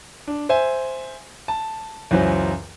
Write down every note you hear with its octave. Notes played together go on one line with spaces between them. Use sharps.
D4
C5 E5 G#5
A5
C#2 F#2 E3 F#3 C5